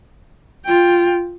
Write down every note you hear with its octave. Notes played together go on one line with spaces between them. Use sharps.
F4 G5